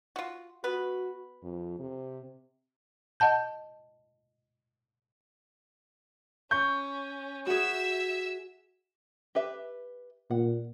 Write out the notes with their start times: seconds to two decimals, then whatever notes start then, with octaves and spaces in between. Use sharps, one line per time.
0.16 F4 F#4
0.64 B3 F#4 B4
1.43 F2
1.79 C3
3.20 D#5 F#5 A5 G6
6.51 C#4 C#6 G6
7.47 F#4 G#4 E5 E6
9.35 G4 B4 E5
10.31 A#2 F#5